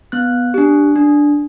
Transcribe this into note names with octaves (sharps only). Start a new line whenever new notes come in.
B3 F#6
D4 G4
D4